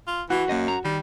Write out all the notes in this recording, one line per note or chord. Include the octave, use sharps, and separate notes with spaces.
F4
E3 F#4
F#2 A#3 D#5
A#5
D#3 G3